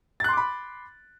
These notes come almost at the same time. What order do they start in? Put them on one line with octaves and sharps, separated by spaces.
A6 F#6 C6 D6 B5